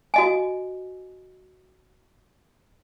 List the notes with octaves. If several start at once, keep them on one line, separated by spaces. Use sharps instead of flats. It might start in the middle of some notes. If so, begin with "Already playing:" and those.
F#4 D#5 G#5